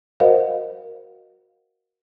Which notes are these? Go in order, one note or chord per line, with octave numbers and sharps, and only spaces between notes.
F#4 A#4 C5 D#5 F5 F#5